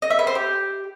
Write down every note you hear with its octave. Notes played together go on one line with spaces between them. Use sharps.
D#5
E5
B4
C5
G4